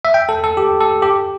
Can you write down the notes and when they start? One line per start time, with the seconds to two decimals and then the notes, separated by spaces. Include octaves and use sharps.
0.05 E5
0.14 G5
0.29 A4
0.44 A4
0.57 G4
0.81 A4
1.02 G4